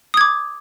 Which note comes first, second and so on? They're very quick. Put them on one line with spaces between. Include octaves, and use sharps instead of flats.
D#6 G#6 D6